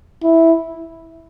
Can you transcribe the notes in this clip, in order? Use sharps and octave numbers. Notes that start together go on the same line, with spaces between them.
E4